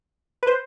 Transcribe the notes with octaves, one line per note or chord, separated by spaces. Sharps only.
B4
C5